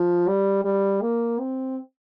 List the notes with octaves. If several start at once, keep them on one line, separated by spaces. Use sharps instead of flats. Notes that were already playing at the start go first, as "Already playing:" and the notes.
Already playing: F3
G3
G3
A#3
C4